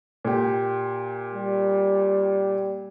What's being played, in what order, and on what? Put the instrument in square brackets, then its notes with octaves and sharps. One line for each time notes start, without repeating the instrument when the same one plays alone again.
[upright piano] A#2 G4
[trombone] G3